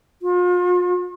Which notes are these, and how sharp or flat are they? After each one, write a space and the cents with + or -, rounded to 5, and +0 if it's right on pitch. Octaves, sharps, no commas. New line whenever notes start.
F4 +40